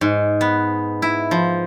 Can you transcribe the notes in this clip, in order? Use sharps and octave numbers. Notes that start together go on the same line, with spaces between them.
G#2
B3
E4
F3